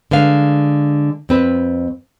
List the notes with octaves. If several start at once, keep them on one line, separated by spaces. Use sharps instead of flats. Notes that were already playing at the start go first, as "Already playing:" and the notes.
D3 G#3 B4 F5
F2 C4 B4